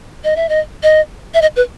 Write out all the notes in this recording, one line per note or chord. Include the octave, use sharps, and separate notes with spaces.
D#5
E5
D#5
D#5
E5
D#5
B4